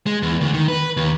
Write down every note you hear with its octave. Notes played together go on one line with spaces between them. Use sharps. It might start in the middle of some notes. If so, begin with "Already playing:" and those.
G#3
E2
D2
D#3
B4
D#2